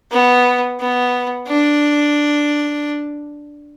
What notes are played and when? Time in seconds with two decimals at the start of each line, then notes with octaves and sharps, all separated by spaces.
0.11 B3
0.80 B3
1.47 D4